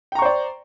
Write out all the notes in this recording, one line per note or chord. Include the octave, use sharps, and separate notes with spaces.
C5 D5 G5 A#5 C#6